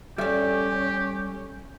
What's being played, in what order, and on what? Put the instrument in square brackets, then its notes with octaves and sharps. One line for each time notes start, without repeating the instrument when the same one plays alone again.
[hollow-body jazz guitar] G3 E5 [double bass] C#4 [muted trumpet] G4 [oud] A4 D5